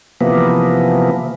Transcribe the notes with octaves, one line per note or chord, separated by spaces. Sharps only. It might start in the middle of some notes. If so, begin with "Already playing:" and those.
C3 E3 F3 A#3 B3